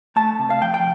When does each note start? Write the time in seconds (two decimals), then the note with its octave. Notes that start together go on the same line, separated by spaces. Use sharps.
0.16 A3 A5
0.39 C3
0.50 F5
0.62 F3 G5
0.74 G5